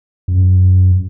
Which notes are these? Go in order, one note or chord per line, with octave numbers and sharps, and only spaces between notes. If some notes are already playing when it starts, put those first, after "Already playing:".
F#2